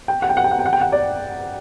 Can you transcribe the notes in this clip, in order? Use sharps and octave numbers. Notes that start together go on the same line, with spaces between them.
G5
F#5
G5
F#5
G5
F#5
G5
F#5
G5
F#5
D5